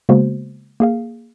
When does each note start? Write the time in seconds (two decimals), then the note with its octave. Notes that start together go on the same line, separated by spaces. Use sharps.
0.09 C#3 G#3 A#3 B3 F#4 C5
0.80 A#3 G#4 F5